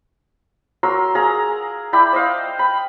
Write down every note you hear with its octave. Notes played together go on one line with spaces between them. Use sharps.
F#3 A#4 C6 E6
G#4 F5 A#5
E4 D5 G5 B5
C5 D#5 F5
B5